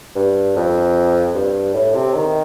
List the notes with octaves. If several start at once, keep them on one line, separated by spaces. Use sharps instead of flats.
G2
F2
G2
A2
C3
D#3